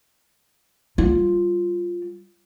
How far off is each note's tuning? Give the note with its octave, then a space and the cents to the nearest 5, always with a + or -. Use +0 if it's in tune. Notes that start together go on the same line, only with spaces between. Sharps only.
G3 -15 F4 +0